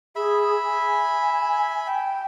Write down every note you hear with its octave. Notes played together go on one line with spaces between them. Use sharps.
G#4 E5 B5
G#5
G5